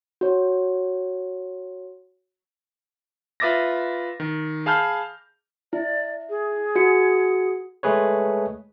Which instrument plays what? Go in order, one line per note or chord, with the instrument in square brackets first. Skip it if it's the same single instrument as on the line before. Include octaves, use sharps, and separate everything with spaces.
[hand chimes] F#4 C#5
[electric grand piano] F4 B4 E5 D6 A6 A#6
D#3
G#4 F5 A5 B5 F6 G6
[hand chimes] E4 [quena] D5
[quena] G#4
[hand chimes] F#4 C#7
[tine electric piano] G#3 A3 G#4 B4 C#5